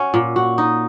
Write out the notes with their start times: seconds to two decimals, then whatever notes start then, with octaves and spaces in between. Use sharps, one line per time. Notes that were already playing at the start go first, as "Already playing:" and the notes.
Already playing: C#4 F#4
0.14 A#2
0.36 F#4
0.58 D#4